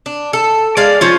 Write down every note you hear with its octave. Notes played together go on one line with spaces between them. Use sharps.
D4
A4
G#3 D5 F5
F3 C#4 F4